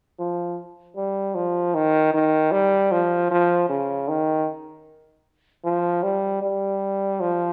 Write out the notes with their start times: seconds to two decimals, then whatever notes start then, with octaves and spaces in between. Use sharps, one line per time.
0.19 F3
0.97 G3
1.35 F3
1.75 D#3
2.14 D#3
2.52 G3
2.92 F3
3.31 F3
3.69 C#3
4.08 D#3
5.65 F3
6.03 G3
6.42 G3
7.21 F3